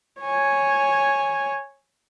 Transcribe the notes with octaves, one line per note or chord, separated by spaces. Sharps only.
C#5 G#5